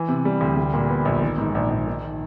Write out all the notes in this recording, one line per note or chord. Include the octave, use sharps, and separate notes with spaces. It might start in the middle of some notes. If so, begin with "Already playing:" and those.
Already playing: E3
C3
G3
D2
G3
A#2
B3
A#1
D#3
G#2
A#1
A#1
D#3